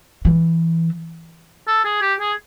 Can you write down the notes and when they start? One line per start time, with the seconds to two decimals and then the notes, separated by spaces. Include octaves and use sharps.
0.25 E3
1.67 A4
1.85 G#4
2.02 G4
2.20 G#4